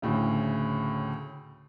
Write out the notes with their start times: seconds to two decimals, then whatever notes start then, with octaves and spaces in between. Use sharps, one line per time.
0.02 D2 A2 C#3